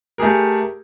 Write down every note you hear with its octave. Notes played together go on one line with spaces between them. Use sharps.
A3 G4 G#4 A#4